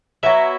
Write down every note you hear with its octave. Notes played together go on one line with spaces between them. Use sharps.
F#3 B3 E4 E5